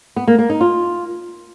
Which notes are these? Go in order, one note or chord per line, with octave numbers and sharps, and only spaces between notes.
B3
A#3
A#3
D#4
F4